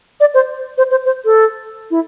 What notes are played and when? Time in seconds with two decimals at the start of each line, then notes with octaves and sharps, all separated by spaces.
0.20 D5
0.34 C5
0.78 C5
0.91 C5
1.06 C5
1.25 A4
1.91 E4